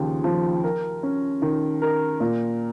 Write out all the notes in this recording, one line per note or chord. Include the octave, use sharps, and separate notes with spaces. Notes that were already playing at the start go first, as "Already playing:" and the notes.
Already playing: D#2 C#3 F3
F3
A#4
C#4
D#3
A#4
A#2